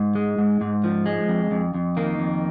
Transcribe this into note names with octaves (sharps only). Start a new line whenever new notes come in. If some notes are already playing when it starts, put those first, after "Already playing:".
Already playing: G#2
G#3
G#2
G#2
F3
G#3
F2
F2
F2
D#3 A#3
F2